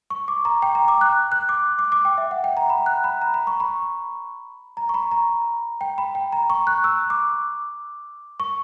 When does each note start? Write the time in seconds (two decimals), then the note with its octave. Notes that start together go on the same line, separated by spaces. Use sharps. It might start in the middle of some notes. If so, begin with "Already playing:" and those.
0.10 C#6
0.28 D6
0.45 A#5
0.62 G5
0.75 A#5
0.88 D6
1.01 F#6
1.32 F#6
1.49 D6
1.79 D6
1.92 D6
2.05 G5
2.18 E5
2.31 F#5
2.44 G5
2.57 A#5
2.70 B5
2.86 F#6
3.04 B5
3.22 A#5
3.34 B5
3.47 C#6
3.60 B5
4.77 A#5
4.89 C#6
4.94 B5
5.11 A#5
5.81 G5
5.98 B5
6.15 G5
6.32 A#5
6.50 C#6
6.67 F#6
6.84 E6
7.10 D6
8.40 C#6